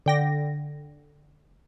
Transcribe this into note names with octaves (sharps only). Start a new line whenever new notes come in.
D3 G5 A#6